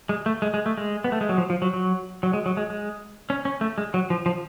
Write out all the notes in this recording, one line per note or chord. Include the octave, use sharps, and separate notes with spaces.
G#3
A3
G#3
G#3
A3
G#3
B3
A3
G#3
F#3
F3
F3
F#3
F#3
F#3
G#3
F#3
G#3
G#3
C#4
C#4
A3
G#3
F#3
F3
F3